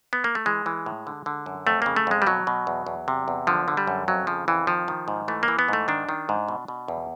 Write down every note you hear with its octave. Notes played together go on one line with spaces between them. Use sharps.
B3
A#3
A3
E3 G#3
E3
A2
D3
D3
F#2
F2 A3
C#3 A#3
A3
F2 G#3
G3
B2 F#3
B2
E2
E2
C3
E2
D3 F3
D3
G3
F#2
F2 F#3
C#3 F3
F2 E3
D#3 F3
D#3
G#2
E3 A3
A#3
E3
B3
G#2 A3
D#3 D4
D#3
G#2
B2
B2
E2